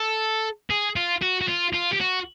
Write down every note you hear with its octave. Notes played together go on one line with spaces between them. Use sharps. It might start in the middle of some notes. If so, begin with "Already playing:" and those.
Already playing: A4
G#4
F4
F#4
F#4
F4
F4
G4
F#4